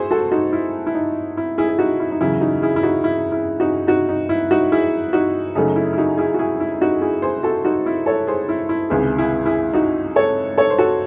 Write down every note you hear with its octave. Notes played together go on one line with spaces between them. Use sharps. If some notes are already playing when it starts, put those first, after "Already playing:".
Already playing: A2 E4 F#4 G#4 C5
F#4 A4
D#4 F#4
E4
E4
D#4
E4
E4 G#4
G#4
D#4 F#4
E4
D#4
E2 C#3 F#3 E4
D#4 F#4
E4 G#4
E4
D#4 F#4
E4
E4
D#4 F#4
D#4 F#4
D#4
E4
D#4 F#4
E4 G#4
D#4 F#4
F#2 C#3 F#3 A3 D#4
E4
E4
D#4 F#4
E4 G#4
F#4
E4 G#4
E4
D#4 F#4
E4 G#4
G#4 C5
F#4 A4
D#4 F#4
E4
A4 C#5
G#4 C5
E4
E4
C#2 C3 D#3 G#3 E4 G#4
E4 G#4
E4 G#4
D#4 F#4
A4 C#5
A4 C#5
C5
F#4 A4